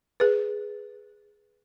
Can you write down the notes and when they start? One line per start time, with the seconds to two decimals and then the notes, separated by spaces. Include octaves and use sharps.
0.20 G#4 B4